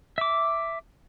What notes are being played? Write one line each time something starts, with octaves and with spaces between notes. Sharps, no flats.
E5 D6